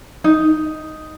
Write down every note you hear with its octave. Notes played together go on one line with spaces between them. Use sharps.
D#4